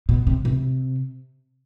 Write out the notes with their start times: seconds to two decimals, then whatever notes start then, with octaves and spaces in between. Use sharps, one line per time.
0.09 B2
0.27 C3
0.45 C3